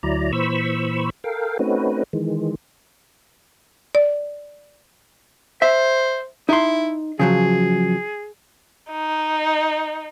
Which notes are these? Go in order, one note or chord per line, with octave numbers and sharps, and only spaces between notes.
D2 F#3 E4 D5 A#5
A#2 E3 C5 B5 C#6 E6
A4 A#4 F5 G5
A3 C4 C#4 D#4 F#4 B4
D#3 E3 G#3
D5
C5 E5
D#4 E4 C6
C#3 F3 F#3 G#4
D#4